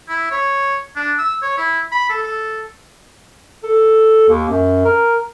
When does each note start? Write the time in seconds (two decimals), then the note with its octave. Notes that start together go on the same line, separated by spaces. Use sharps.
0.09 E4
0.31 C#5
0.96 D4
1.19 E6
1.42 C#5
1.58 E4
1.92 B5
2.10 A4
2.23 A4
3.64 A4
4.28 D#2
4.49 F#2
4.85 A#4